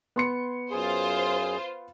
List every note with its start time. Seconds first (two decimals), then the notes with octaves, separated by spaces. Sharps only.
0.16 B3 C6 C#7
0.71 F#2 F4 G#4 C5